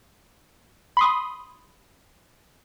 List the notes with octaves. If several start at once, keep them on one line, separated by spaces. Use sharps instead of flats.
B5 C6 D#6